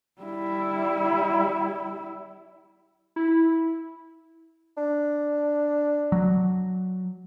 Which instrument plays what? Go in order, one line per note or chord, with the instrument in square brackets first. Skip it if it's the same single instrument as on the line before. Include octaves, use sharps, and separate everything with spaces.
[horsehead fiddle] G3 E4
[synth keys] E4
[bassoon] D4
[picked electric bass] F#3